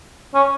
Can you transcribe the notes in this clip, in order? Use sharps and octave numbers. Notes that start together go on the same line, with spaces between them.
C#4